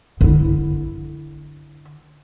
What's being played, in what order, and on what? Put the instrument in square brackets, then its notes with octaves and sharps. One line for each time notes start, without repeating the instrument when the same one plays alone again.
[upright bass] D3 E4